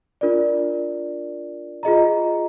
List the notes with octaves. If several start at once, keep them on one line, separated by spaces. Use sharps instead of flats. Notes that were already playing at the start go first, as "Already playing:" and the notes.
D4 F4 A#4 D5
F4 G#4 D#5 A#5